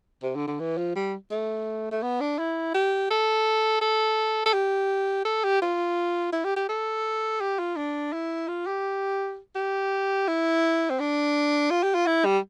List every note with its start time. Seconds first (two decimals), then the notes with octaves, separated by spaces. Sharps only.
0.23 C3
0.36 D3
0.48 D3
0.60 E3
0.78 F3
0.96 G3
1.31 A3
1.91 A3
2.03 B3
2.20 D4
2.39 E4
2.74 G4
3.11 A4
3.81 A4
4.46 A4
4.53 G4
5.25 A4
5.44 G4
5.62 F4
6.33 E4
6.44 G4
6.56 G4
6.69 A4
7.41 G4
7.59 F4
7.77 D4
8.13 E4
8.48 F4
8.66 G4
9.55 G4
10.28 E4
10.90 C4
11.00 D4
11.70 F4
11.83 G4
11.95 F4
12.07 E4
12.25 G3